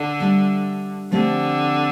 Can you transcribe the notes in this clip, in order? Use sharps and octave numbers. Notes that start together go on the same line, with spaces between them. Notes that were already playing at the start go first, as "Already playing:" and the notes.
Already playing: D3
G3 D4 A4 E5
D3 F3 A3 C4 G4